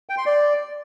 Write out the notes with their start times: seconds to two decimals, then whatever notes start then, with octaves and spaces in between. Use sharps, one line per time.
0.09 G5
0.18 C6
0.26 D5